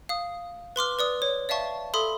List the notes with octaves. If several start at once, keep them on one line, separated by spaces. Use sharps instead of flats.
F5 D#6
B4 C6 D6 F6
B4 D5 D#6
C#5
D5 E5 F5 A5 C#6
A4 E5 B5 C6 D#6